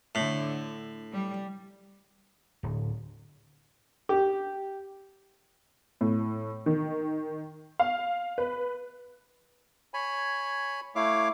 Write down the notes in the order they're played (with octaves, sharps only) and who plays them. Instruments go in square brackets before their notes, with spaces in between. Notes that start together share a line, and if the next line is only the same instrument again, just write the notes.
[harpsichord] A2 [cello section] D3
[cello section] G3
[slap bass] D1
[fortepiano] G4
[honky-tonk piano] A2
D#3
F5
B4
[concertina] C#5 G#5 B5
A3 E4 C#5 F5 D6